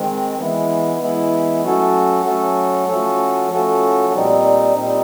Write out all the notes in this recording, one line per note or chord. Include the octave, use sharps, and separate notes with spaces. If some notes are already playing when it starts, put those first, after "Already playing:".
Already playing: D#3 G#3 C4
E3 G#3 B3 E4
E3 G#3 B3 E4
F#3 A3 C#4 F#4 A4
F#3 A3 C#4 F#4 A4
F3 A3 C#4 F#4 A4
F3 A3 C#4 F#4 A4
A#2 G3 C4 D#4
A#2 G3 C4 D#4